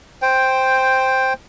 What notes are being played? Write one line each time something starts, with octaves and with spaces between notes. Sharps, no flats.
C5 G5